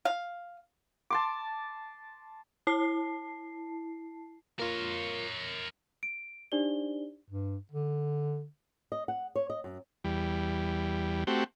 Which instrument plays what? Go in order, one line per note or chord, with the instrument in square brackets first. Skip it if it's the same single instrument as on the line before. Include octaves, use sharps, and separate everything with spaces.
[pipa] F5
[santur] A5 C6 D6
[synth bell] E4 A5 C7
[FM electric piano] A#3 F4 [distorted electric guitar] A#4 C#5
[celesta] D7
D4 D#4 G4 C5 D5 G7
[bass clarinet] G2
D3
[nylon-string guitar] D#5
F#5
C#5
D#5
F#2
[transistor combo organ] E2 G3
A3 C4 F#4 G4